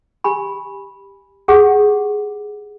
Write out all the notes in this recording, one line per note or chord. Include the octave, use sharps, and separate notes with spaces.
G4 G#5 B5
G4 G#4 F#5